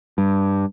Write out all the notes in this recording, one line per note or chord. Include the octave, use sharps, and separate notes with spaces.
G2